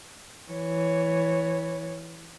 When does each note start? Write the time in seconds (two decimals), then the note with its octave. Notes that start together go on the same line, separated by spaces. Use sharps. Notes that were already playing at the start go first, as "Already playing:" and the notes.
0.51 E3 C#5